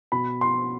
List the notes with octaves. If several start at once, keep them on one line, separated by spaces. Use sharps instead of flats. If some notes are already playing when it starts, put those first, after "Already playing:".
B2 B5
C6